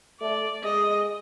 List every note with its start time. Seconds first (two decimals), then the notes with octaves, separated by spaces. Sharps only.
0.21 A3 D5
0.64 G#3 D#5